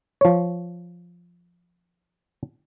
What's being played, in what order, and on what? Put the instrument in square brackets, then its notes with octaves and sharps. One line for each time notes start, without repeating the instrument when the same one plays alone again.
[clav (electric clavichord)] F3 C#5